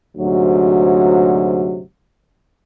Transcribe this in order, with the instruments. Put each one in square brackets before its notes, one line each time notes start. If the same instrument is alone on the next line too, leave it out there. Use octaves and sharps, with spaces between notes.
[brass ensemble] D2 G#2 C3 F#3